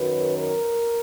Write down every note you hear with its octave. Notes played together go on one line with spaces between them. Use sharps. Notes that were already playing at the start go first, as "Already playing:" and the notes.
Already playing: F#2 D#3 F#3 B4
A#4